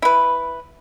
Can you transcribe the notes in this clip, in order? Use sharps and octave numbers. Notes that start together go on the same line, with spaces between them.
E4 B4